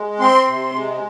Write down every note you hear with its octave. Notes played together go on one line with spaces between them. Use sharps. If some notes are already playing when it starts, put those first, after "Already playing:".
Already playing: G#3
C4 C6
C3
G#3